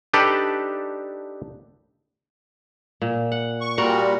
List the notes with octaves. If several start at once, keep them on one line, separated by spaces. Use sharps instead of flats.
D4 D#4 G4 A4 B4 D5
A#2
F#5
C#6
A#2 G3 F#4 A#4 F#5